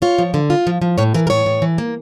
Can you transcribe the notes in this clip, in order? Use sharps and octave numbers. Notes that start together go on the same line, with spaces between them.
F4 C#5
F3
D3
F4
F3
F3
A2 C#5
E3 A#4
A#4
A2 C#5
A2
E3
A#3